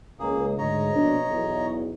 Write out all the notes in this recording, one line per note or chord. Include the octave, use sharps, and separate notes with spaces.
C#2 A#3 G#4
D2 G#2 C#5 D#5 A#5
A#1 B2 D4
B1 E2